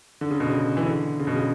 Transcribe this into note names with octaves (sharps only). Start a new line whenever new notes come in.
D3
C#3
B2
C#3
E3
D3
C#3
B2
C#3